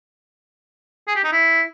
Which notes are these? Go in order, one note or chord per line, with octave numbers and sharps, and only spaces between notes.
G#4
G4
D#4
E4